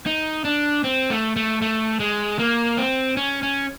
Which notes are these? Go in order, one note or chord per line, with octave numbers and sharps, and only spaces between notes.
D#4
D4
C4
A3
A3
A3
G#3
A#3
C4
C#4
C#4